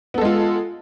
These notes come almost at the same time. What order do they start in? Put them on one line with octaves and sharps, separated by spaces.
B3 A4 G#3 F4